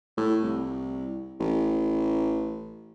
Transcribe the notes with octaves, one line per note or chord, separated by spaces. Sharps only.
A2
C2
A1